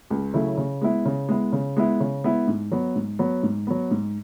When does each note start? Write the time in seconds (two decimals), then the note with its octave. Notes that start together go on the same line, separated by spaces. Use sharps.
0.10 C#2
0.34 C#3 F#3 A3 E4
0.57 C#3
0.81 G#3 B3 E4
1.05 C#3
1.29 G#3 B3 E4
1.53 C#3
1.77 G#3 B3 E4
2.00 C#3
2.24 G#3 B3 E4
2.48 G#2
2.72 F#3 B3
2.95 G#2
3.19 F#3 B3
3.43 G#2
3.67 F#3 B3
3.91 G#2